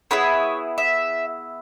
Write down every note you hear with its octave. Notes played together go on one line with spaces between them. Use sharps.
B3 E4 G#4 C#5
E5